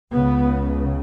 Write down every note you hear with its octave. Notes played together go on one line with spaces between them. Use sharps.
C#2 C#3 B3